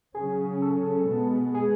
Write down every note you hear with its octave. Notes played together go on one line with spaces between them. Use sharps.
C#3 F#3 C#4 G#4
A4
B2 G#3 B3
G#4